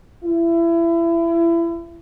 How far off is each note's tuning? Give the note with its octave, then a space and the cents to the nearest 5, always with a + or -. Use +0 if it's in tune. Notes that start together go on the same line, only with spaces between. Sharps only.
E4 +30